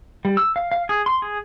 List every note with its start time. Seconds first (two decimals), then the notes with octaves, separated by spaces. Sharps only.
0.25 G3
0.37 E6
0.56 F5
0.72 F5
0.89 G#4
1.06 C6
1.22 G#4